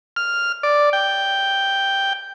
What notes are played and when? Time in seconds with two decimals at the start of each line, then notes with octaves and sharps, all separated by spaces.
0.16 F6
0.63 D5
0.93 G5